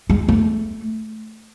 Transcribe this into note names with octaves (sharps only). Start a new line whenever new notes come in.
G#3
A3